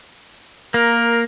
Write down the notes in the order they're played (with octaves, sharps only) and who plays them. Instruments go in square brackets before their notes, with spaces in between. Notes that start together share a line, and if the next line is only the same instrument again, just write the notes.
[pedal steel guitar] A#3 [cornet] A#4